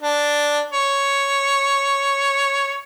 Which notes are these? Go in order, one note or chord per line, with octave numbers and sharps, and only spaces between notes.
D4
C#5